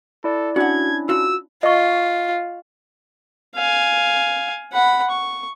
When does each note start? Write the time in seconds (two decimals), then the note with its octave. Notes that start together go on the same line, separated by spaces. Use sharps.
0.24 E4 A4 D5
0.56 C#4 D4 E4 F#4 F#5 G#6
1.09 F4 F#4 E6
1.63 F4 D#5 C#6
3.55 F5 G#5
4.73 F#5 B5
5.10 C#6